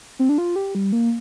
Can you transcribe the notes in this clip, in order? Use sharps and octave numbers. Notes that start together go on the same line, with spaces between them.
C4
D4
F4
G4
G3
A#3